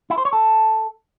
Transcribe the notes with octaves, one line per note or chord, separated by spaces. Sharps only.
E4
C5
C#5
A4